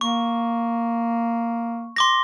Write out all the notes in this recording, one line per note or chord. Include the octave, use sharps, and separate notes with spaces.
A#3 C#6
C6 D6 A#6